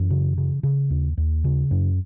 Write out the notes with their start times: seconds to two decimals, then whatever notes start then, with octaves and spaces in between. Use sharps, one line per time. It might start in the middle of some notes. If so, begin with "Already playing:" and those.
Already playing: F#2 E3
0.10 C#3
0.38 C#3
0.63 C#3
0.90 D#2
1.17 D#2
1.44 C#3
1.71 F#2